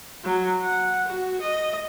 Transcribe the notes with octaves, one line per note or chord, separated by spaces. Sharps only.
F#3
F#5
F#4
D#5